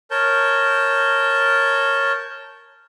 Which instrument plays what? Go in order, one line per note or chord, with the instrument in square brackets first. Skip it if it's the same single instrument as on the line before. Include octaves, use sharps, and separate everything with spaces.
[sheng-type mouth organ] A#4 C#5 A5 G6